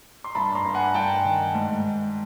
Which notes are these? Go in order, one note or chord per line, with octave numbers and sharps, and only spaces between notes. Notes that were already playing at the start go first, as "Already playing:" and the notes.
C6
G2 A5 B5
A#5 C6
G2
F#5 G#5
G2 G5 A5
D#3
G#2